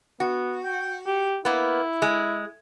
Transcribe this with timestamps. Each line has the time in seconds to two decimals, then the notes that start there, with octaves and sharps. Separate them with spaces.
0.20 B3 F#4
0.64 G5
1.06 G4
1.45 A#3 B3 E4
2.02 G#3